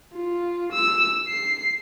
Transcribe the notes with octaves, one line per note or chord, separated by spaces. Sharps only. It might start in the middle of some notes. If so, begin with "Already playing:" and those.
F4
E6
C7